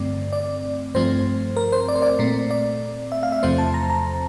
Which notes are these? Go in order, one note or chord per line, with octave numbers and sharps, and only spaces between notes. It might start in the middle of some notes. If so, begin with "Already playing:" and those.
Already playing: G2 D3 A3 C4 D5
D5
G2 F3 A3 C4 C5
A#4
C5
D5
C5
D5
A#2 A3 C4
D5
E5
F5
E5
E2 C3 F3 A3 C4 C5
A5
A#5
A#5